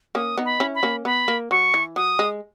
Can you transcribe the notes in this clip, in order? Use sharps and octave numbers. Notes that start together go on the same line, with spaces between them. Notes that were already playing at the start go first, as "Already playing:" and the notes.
A#3 C#4 D#6
B3 D#4
B5
C#4 E4
B5
A#3 C#4
B3 B5
A#3
F#3 C#6
E3
F#3 D#6
G#3